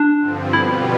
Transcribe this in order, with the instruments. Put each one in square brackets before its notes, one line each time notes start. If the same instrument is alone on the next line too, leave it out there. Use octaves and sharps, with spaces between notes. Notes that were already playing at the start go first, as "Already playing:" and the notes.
Already playing: [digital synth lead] D4
[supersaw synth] G2 D3 F3 C4
[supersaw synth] B2 G3 B3 F4 [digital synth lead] E4